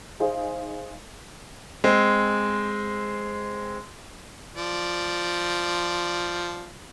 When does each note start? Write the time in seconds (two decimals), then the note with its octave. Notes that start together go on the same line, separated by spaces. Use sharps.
0.20 D#4 G#4 C5 F5
1.84 G#3 C4
4.56 F3 D5